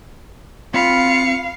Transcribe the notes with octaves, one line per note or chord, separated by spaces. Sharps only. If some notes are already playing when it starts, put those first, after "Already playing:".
C4 F4 F5 B5 C#7